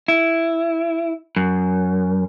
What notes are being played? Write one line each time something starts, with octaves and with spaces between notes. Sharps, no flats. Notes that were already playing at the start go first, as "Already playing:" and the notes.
E4
F#2